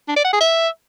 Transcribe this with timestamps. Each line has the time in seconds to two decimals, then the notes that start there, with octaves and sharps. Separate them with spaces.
0.08 D4
0.16 D5
0.24 F#5
0.33 G#4
0.41 E5